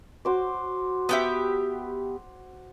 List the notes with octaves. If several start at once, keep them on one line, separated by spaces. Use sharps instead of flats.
F#4 C5 D6
B3 G4 E5